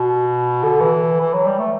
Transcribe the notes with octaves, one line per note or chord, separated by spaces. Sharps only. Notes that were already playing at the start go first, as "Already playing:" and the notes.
Already playing: B2
D3
E3
E3
F#3
G3
A3